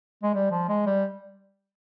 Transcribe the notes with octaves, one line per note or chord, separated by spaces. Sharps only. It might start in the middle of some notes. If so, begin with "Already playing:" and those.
G#3
G3
F3
G#3
G3